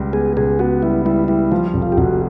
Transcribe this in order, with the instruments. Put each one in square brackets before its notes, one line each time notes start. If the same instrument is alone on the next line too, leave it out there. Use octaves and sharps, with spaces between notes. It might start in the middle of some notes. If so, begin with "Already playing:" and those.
Already playing: [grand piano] C#2 G3
[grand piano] B3 [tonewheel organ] G#4
[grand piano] C#2 [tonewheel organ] G#4
[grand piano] B3 [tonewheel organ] F#4
[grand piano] G3 [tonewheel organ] E4
[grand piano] G3 [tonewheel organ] E4
[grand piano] G3 [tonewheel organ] E4
[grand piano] F3 [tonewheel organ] F4
[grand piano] F1
[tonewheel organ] F4
G4
[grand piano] F1 [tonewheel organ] F#4